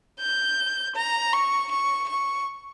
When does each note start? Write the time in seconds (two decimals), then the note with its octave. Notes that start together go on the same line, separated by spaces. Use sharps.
0.20 G6
0.96 A#5
1.33 C#6
1.71 C#6
2.09 C#6